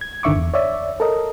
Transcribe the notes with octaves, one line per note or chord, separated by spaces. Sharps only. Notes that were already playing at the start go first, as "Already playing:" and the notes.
G#6
G1 D3 D#3 E5 C#6 D6
E2
C#5 D5 E5
A4 A#4 D#5